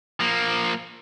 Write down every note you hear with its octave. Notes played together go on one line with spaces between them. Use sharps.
F3 A#3